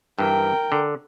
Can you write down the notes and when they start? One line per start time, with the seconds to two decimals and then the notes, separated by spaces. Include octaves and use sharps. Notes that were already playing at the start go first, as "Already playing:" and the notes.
0.18 G2 E3 A#4 G5
0.72 D3